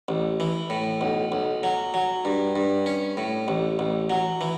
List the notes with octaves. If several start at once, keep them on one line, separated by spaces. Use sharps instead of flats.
A1
E3
A2
B1
B1
F#3
F#3
G2
G2
C#4
A2
A1
A1
F#3
E3